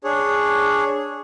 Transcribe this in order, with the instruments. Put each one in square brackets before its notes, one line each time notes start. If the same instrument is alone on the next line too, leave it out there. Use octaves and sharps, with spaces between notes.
[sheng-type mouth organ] D4 G#4 C#5